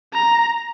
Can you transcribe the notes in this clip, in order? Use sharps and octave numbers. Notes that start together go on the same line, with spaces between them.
A#5